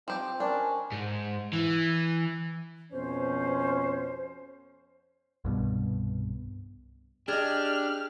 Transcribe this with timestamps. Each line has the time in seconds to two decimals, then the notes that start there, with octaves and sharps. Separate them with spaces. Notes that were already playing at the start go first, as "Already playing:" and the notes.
0.08 F3 C4 G4
0.40 C#4 D4 A#4 A5
0.92 G#2
1.53 E3
2.93 F2 B2 C#4 C5
5.45 C2 G2 B2
7.28 D4 G4 G#4 D#5 F6